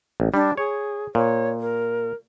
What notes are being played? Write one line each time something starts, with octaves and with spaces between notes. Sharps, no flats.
A1
G3 D4
G#4 C#5
A#2 C#5
A#4